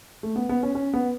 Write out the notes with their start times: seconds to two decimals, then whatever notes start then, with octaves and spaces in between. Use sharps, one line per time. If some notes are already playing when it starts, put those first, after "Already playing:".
0.23 A3
0.36 B3
0.49 B3
0.63 C#4
0.75 C#4
0.93 B3